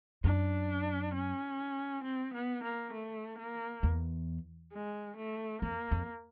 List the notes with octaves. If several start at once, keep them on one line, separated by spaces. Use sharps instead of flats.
F#2 D4
C#4
C4
B3
A#3
A3
A#3
E2
G#3
A3
F2 A#3
F2